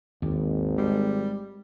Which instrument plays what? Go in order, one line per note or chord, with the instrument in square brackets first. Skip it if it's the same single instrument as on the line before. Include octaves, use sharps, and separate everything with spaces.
[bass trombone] G#1 [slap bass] D#2
[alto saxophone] G3 [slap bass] G#3